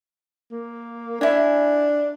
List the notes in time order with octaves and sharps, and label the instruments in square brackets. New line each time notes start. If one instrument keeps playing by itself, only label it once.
[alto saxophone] A#3
[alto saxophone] D4 [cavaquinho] E4 G#5